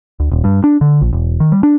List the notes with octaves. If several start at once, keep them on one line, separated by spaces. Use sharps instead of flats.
D2
D#1
G2
D4
D3
A#1
E1
D#3
G3
D4